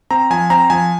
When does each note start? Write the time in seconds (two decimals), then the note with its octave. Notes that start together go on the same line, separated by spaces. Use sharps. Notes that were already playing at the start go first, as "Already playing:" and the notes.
0.11 C4 A#5
0.30 F3 G#5
0.50 C4 A#5
0.70 F3 G#5